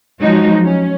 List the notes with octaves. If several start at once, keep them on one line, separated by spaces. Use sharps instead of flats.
F3 F#3 G#3 D#4 F#4
C#4